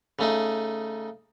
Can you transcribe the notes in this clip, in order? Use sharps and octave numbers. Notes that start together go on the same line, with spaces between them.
C#3 A3 D#4